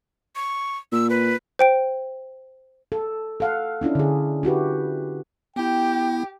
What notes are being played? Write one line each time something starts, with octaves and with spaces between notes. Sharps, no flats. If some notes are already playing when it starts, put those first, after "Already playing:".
C#6
A#2 E6
B4
C5 G5 D7
A4
A4 F5 F#5
C#4 D4 E4 F4
D3 G#4
E4 F#4 G4 B4
B3 E4 G4 G5